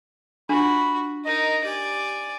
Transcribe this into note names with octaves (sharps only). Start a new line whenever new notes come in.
D4 F4 F#4 B5
D#4 A#4 D#5
G4 D5 G#5